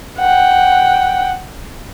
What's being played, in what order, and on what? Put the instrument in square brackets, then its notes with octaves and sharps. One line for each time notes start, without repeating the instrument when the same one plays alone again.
[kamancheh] F#5 G5